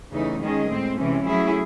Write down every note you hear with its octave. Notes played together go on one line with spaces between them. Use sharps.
E2 C#3 E3 A3 D#4
D#3 G#3 C#4 G#4 D#5
A2 G#3 C4
C3 E3 G#3 C#4
F#3 A3 C#4 E4 G#4